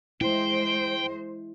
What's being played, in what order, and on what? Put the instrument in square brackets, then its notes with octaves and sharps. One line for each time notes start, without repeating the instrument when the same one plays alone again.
[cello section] G#3 C5 [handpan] E4 [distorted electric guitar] G5